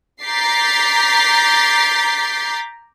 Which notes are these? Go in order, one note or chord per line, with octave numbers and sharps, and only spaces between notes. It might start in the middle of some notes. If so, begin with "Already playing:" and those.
A#5 D6 G6 A6 B6 C7